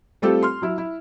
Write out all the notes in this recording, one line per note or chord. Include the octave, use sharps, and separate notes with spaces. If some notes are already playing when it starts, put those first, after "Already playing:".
G3 A3 C4 F4 G4 A4
C6 F6
F#3 E4
E4